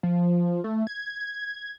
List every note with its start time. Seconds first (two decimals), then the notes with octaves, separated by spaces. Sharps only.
0.03 F3
0.64 A3
0.87 G#6